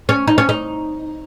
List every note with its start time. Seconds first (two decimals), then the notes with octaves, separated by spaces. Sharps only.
0.09 C#4
0.27 D#4
0.38 C#4
0.49 D#4